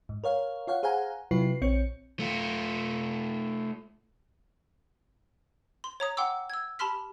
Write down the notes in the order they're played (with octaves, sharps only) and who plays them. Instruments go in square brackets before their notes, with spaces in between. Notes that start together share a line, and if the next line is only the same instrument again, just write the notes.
[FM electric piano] G#2
A#4 C#5 F5
F4 C#5 F5 F#5
G#4 C5 F5 F#5 G#5 A#5
C3 F#3 E4 F4 B4 C7
A#1 C4 C#5 C#7
[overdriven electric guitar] A3 F4
[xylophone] C6
C#5 A#5 D#6
F#5 G5 C6 D6 E6
E6 G#6
G4 A5 B5 C6 F6 B6